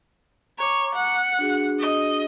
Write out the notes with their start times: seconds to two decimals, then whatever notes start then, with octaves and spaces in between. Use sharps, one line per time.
0.58 C#5 A#5 C#6 D6
0.95 F#5
1.39 D4 F#4 G#4
1.79 D#5